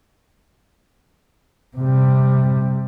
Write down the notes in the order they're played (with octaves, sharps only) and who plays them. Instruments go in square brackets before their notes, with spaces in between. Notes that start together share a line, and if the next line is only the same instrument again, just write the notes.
[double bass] C3 G3